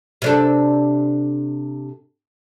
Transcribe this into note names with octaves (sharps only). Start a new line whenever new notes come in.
C3 D4 A4